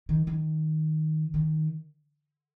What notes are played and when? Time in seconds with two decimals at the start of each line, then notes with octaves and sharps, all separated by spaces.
0.09 D#3
0.27 D#3
1.34 D#3